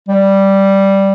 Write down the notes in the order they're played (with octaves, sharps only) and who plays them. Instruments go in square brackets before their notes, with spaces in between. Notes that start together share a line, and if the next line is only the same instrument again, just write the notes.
[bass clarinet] G3